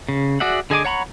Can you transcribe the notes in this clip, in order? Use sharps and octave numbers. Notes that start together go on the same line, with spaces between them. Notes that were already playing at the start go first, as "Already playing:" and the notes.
C#3
F#4 G#4 D5 E5 F#5
D3 G#4 D#5 G#5 D6
C#5 F#5 A#5 B5 C#6